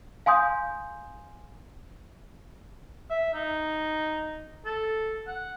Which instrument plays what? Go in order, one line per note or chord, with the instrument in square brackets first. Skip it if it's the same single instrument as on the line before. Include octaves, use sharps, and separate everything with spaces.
[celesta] F5 G#5 C6 D#6 G6
[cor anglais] E5
D#4
A4
F#5